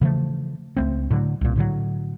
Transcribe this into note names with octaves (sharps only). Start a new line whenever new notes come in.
C#3 E3 F3 A3
C#2 A3 C4
A2 D3 F#3
C2 A#2
A2 D3 F3 F#3